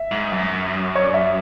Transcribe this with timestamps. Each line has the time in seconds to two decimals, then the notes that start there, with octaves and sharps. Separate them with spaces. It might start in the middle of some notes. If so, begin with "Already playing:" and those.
Already playing: E5
0.11 G#2
0.32 F#2
0.95 C#5
1.04 D5
1.14 E5